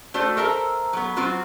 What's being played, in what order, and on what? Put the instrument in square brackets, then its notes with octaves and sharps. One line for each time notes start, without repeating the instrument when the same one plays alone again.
[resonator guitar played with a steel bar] A3 F#4 C5 D5
A4 A#4 C5 E5 A5 A#5
F#3 B3
F#3 C4 F4 F#4